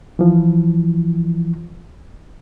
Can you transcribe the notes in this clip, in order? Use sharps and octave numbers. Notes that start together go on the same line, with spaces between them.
E3 F3